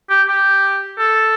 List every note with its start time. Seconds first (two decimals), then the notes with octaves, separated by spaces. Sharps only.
0.10 G4
0.28 G4
0.99 A4